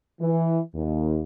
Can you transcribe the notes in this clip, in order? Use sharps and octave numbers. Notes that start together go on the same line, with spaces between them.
E3
D#2